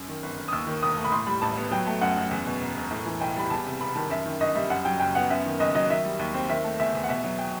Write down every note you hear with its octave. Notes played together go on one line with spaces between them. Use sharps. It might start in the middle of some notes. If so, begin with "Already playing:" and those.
Already playing: F#2
D#3
G1
G1
D#6
D#2 E6
D#3
E1 D#6
A3
B5
A2 C6
G3 B5
A1 A5
B3
F#3 G5
A3
F#2 F#5
F#2
E2
B2
E1
E1
A2
E3
B1 G5
G3 B5
E2 A5
C3
E1 B5
D#3 A5
F#2 E5
D#3
G1 D#5
G3 E5
F#2 F#5
F#3 G5
F#1 G5
B3 F#5
F#2 E5
D#3
F#1 D#5
F#3 D#5
D#3 E5
G3
D#2
C4
D#3 E5
A3
E2 E5
E2
F#5
B2 E5
F#3
G5